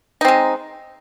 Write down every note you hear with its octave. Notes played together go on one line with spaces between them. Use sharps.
G#3 C4 D#4